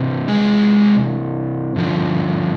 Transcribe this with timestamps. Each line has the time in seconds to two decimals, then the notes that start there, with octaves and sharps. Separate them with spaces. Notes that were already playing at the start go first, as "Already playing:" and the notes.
Already playing: C3 E3 C4
0.28 G#3 G#4
1.76 G2 D3 F3